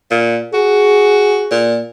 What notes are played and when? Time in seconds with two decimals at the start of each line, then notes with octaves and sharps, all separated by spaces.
0.11 A#2
0.53 F#4 G#4
1.51 A#2